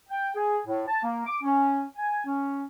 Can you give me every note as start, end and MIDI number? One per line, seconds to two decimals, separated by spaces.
0.09 0.33 79
0.35 0.58 68
0.66 0.83 45
0.88 1.02 81
1.03 1.26 58
1.26 1.37 86
1.43 1.83 61
1.96 2.23 80
2.25 2.62 61